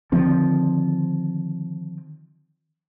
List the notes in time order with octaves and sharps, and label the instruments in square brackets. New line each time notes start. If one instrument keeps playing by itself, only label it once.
[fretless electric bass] D3 D#3 F3 C4